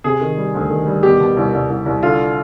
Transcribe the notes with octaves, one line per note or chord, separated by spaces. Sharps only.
C3 G#4
D#3
G3
D2
D#3
G3
B2 G4
B2
C2
C2
C2
C2
D3 F4